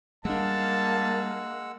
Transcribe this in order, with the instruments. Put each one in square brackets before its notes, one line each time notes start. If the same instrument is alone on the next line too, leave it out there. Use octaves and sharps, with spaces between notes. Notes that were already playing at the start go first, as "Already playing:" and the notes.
[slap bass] G3 D4 [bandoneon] G#3 F#5 E6 [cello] A#3 F5 [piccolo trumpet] A5